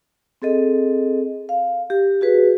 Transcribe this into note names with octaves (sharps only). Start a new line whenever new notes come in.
C4 G#4 A4 D#5
F5
G4
F#4 G#4 B4